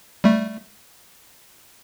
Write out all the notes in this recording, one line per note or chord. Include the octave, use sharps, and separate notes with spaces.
G3 A3